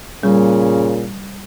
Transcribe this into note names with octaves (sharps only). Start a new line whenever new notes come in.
A#2 C#3 G3